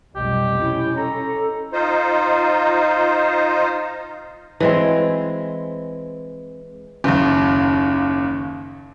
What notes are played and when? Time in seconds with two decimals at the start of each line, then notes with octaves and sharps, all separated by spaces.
0.16 F1 B1 G3 G4 D#5
0.61 C#4 E4
0.97 A4 A#5
1.73 D#4 F4 C5
4.60 E3 G#3 C4
7.04 F#1 D#2